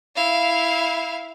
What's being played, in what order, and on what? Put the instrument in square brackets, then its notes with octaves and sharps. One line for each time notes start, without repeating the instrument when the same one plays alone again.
[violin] E4 F5